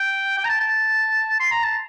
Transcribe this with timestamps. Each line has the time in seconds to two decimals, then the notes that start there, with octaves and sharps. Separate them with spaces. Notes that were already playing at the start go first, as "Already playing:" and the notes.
Already playing: G5
0.38 G5
0.45 A#5
0.49 A5
0.60 A5
1.40 C6
1.51 A#5
1.63 A5